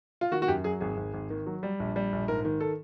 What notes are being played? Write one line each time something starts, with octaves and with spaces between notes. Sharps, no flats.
F4
D#3 F#4
F#4
F#2 G4
F#3 G#4
G#1 G#4
G#1
G#1
D#3
F#3
G3
A#1
G3
A#1
G#2 A#4
D#3
A4